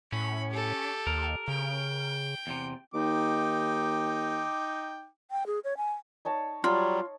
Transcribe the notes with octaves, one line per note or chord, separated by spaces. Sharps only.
A2 C#4 B5
G4 A4
D#2 A#4
C#3 G5
E2 C3
D#2 D#4 G5 D6
G5
G#4
C#5
G#5
D#4 C#5 A5
F#3 G3 F4